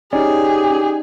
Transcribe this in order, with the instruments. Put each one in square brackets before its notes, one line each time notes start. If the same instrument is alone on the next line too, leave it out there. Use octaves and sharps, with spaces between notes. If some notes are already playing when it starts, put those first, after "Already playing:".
[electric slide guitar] C#4 [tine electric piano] D#4 D5 [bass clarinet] G4 [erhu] G#4